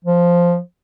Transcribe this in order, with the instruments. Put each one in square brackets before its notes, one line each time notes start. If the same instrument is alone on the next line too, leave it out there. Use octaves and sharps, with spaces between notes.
[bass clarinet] F3